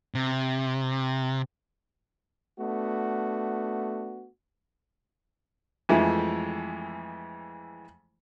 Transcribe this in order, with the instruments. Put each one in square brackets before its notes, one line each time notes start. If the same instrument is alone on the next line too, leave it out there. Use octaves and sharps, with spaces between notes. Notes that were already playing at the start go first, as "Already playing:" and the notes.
[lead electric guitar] C3
[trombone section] A3 B3 D4 F#4
[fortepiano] F2 E3 G#3 A3